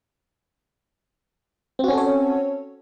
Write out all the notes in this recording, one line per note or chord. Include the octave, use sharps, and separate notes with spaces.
C4 C#4 F#4 A4 C#5